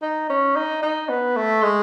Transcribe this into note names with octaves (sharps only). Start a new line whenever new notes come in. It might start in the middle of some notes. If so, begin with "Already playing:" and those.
D#4
C#4
D#4
D#4
B3
A3
G#3